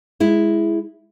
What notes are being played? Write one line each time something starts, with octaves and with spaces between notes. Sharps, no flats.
G#3 E4